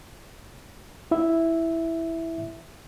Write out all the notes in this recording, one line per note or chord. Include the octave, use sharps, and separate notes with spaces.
E4 E5